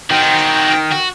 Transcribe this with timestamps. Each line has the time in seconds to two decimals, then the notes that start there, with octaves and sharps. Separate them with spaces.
0.10 D#3 C4 F#4 G5
0.92 F#4